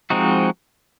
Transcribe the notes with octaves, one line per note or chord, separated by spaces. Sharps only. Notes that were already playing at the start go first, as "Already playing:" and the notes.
F3 G#3 C4 D#4 F#4